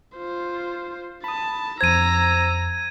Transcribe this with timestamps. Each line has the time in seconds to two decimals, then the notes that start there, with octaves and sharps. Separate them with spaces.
0.16 F4 C5
1.24 A5 B5 D#6
1.81 F2 C5 A#5 E6 G#6 D#7